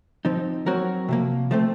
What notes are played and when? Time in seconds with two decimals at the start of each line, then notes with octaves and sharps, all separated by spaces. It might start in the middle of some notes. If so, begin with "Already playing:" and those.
0.25 F3 C4 D#4
0.66 F#3 C4 F#4 A#4 C#5
1.09 C3 F3 A#3
1.51 F3 A3 C4